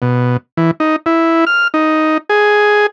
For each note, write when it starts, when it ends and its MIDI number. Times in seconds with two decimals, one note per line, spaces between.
0.02 0.37 47
0.57 0.71 52
0.80 0.96 63
1.06 1.45 64
1.47 1.68 89
1.74 2.18 63
2.29 2.86 68